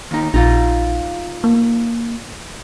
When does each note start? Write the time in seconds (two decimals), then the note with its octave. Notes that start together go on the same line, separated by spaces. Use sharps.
0.11 D#2 D#4
0.34 A#1 D#4 F4
1.44 A#3